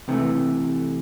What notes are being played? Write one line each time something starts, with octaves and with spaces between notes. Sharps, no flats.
C3 E3 A3